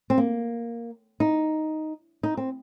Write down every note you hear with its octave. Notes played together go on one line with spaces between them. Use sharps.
C4
A#3
D#4
D#4
C4